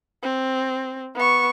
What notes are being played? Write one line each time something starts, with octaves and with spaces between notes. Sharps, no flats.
C4
B3 C#6